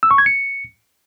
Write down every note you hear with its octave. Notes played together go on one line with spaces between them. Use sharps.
E6
C#6
G#6
C#7